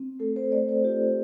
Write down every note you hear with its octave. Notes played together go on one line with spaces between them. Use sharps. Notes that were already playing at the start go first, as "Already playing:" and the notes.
Already playing: C4
A3 A4
C5
A3 D5
C5
F4 G4